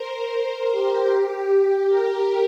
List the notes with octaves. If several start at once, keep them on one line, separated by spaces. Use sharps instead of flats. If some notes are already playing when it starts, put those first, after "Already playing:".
Already playing: A#4 C5
A#4
G4
G4
A#4